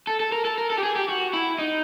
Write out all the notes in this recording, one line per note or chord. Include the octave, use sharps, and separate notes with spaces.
A4
A4
A#4
A4
A#4
A4
G4
G#4
G4
F#4
E4
D#4